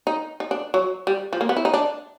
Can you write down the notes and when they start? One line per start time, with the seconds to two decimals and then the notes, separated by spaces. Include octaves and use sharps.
0.07 D#4
0.40 D#4
0.51 D4
0.74 F#3
1.07 G3
1.33 F3
1.41 A#3
1.49 B3
1.57 E4
1.65 D#4
1.74 D4